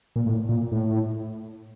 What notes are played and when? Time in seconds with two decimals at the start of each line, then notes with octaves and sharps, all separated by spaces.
0.16 A#2
0.26 A2
0.49 A#2
0.72 A2